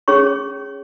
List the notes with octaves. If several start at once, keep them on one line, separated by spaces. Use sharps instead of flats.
C#4 G#4 C#5 C#6